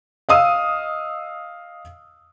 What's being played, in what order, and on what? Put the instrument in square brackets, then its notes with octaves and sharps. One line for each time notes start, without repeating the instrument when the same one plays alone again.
[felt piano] D#5 F5 D#6 E6